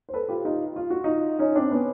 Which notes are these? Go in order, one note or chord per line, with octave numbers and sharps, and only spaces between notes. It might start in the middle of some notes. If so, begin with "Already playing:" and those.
C5
A4 B4
F4 G4
D#4 F4
F4
F#4
D#4 F4
C#4 D#4
C4 D4
B3 C#4